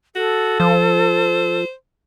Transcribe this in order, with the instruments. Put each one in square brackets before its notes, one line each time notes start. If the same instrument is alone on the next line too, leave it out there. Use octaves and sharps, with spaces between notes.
[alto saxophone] F#4 [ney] A4
[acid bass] F3 [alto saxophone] C5